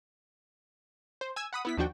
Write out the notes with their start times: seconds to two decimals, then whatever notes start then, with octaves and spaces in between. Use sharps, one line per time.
1.21 C5
1.36 G#5 E6 G#6
1.53 F#5 B5 D#6
1.65 B3 E4 B6
1.77 D#2 F3 D4 F#4 G5